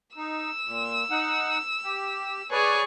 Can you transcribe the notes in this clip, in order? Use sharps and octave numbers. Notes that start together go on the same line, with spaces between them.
D#4 E6
A#2
D#4 F#5
G4
G#4 B4 C#5 D5 C#6